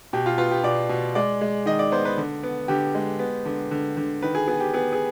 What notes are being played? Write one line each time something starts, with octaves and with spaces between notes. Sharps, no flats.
B2 G4
F4
B3 F4
G4
B2 D5
B2
G#3 D5
G#3
D#3 D#5
D5
B3 C5
B4
D3
B3
D3 G4
G#3
B3
D3
D3
D3
D#3 B4
G#4
B3 G#4
G4
B3 G#4
G#4